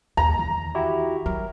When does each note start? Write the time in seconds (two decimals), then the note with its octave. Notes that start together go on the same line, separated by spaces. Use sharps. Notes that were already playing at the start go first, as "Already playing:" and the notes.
0.17 D#2 A#5
0.39 E2 D#3
0.75 E4 F#4 G4
1.26 F#3 A#4